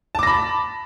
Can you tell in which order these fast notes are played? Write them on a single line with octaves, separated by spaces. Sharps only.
A5 D6 A#6 B5